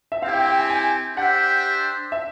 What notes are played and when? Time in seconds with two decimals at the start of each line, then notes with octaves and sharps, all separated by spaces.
0.12 E5
0.22 C4 E4 G4 F5
0.34 G5
0.46 G5
0.58 G#5
0.69 G#5
1.17 D4 G4 C5 E5 F#5 G5
2.12 E5